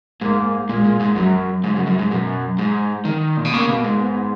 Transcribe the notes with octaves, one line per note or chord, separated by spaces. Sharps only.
G#2 A#3
A#2 G#3
A#2
G#2
F#2 F#3
G#2 C#3
F#2
F#2
G#2
F#2 B2
G#2
D#3
A#2
B2
C#3 A#3
B2
G#2
B3